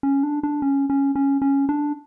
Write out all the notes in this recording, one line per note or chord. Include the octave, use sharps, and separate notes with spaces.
C#4
D4
D4
C#4
C#4
C#4
C#4
D4